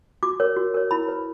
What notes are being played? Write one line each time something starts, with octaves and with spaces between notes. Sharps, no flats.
F#4 D6
A#4 C#5
F#4
A#4 C#5
E4 B5
B4